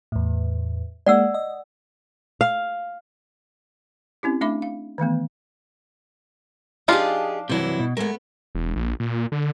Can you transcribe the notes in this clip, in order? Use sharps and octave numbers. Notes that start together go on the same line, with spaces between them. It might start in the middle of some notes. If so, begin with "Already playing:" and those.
E2 A2
G#3 A#3 D5 F#5 E6
D#5
F5
C4 C#4 E4 G4
A3 D4 E5 B5 D6
F5
D#3 E3 A3 B3
F3 D4 D#4 F4 G4 G#4
G2 C3 E3 F#3 E4
B2
G#3 A3 B3 A#4
E1
A#1
A#2
D3